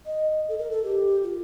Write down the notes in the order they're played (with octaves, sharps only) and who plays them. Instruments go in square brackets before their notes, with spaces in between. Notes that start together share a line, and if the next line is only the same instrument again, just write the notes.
[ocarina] D#5
A4
A#4
A4
G4
F4